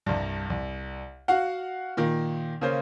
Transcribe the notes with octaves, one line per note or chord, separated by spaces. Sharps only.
C2 G2
C2
F#4 F5 F#5
A#2 D#3 A#3
C#3 A#3 C#4 C5